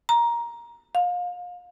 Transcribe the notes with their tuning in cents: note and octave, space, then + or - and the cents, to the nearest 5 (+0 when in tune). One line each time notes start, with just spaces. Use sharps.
A#5 +15
F5 +30